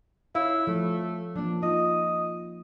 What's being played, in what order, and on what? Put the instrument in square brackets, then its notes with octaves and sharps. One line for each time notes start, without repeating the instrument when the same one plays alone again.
[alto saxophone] E4 [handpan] C#5 F5
[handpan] F3 [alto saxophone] A3
[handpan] F3 A#3 [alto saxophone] D4
[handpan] D#4 F4 [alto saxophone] D#5